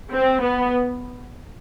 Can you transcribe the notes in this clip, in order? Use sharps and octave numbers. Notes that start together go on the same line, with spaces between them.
C4
B3